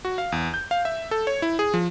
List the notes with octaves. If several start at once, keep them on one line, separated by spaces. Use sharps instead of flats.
F#4
F5
E2
G6
F5
E5
A4
C#5
E4
G#4
F3